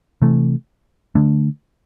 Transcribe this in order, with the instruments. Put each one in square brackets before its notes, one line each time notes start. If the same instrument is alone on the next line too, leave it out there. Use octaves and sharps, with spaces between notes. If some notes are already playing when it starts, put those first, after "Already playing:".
[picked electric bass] C3 E3 A3
D3 A3 D4